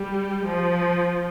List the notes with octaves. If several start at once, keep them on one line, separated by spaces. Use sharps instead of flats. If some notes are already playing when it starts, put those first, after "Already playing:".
Already playing: G3
F3